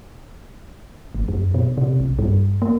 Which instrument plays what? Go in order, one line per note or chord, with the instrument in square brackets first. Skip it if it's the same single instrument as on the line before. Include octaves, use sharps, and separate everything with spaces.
[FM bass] G#1
F#2
B2
C3
B1
G2
A#3